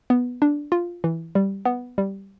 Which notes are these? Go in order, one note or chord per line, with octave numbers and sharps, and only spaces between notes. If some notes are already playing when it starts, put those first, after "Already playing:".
B3
D4
F4
E3
G3
B3
G3